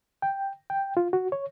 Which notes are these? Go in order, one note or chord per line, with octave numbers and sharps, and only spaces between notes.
G5
G5
F4
F#4
C#5